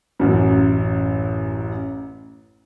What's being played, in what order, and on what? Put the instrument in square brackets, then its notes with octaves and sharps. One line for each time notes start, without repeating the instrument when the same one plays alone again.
[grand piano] A1 F#2